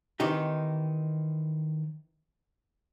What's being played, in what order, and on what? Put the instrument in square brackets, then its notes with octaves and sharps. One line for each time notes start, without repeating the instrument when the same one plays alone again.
[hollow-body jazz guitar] D#3 E3 C4 D#4 G4